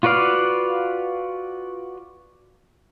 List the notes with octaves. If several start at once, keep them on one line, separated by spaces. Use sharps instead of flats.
F4 F#4 B4 D5 F5